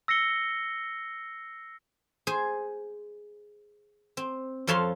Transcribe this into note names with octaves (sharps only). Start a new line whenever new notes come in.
E6 A#6 C7 C#7 G7
G#4 C5 G#5
C4
F2 F3 A4 C#5 F5 C6